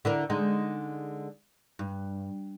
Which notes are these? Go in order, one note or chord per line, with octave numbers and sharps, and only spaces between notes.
D3 E4 A#4
D3 G#3 D#4
G2